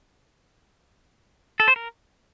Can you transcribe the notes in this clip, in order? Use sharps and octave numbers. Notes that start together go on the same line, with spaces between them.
A4
C5
A#4